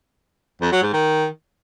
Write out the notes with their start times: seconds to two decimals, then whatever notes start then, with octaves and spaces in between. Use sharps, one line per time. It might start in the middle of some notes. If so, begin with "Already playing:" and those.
0.62 F2
0.72 F#3
0.83 G#2
0.93 D#3